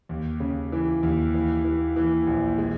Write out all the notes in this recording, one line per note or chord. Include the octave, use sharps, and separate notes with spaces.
D#2
C#3
E3
D#2
E3
E3
E3
A#1
G#3